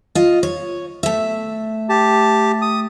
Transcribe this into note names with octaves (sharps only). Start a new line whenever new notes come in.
F4 D#5
C#5
A3 E5
G4 A5
D#6